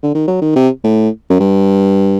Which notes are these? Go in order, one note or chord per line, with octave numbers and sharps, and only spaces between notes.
D3
D#3
F#3
D#3
C3
A2
F#2
G2